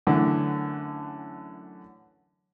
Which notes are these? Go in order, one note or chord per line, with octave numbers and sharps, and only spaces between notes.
F#2 D3 E3 A3